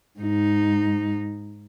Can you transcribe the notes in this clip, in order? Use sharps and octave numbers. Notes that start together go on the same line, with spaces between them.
G#2 D#4